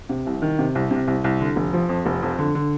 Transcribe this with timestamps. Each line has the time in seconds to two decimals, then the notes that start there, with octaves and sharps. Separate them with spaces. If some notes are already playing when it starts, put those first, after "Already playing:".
0.09 C3
0.26 C2
0.42 D#3
0.59 C3
0.75 C2
0.91 C3
1.07 C2
1.24 C2
1.40 D3
1.56 F1
1.73 F3
1.89 F2
2.06 F1
2.22 F2
2.39 D3
2.55 D3